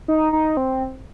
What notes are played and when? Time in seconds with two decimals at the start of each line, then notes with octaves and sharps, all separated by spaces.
0.08 D#4
0.33 D#4
0.57 C4